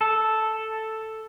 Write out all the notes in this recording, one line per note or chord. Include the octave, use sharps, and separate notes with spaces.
A4